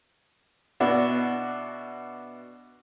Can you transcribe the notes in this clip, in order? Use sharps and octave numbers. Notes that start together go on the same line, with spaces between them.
B2 D4 E4 F#4